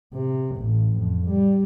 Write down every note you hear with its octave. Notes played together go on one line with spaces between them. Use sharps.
C3
A1
F2
G3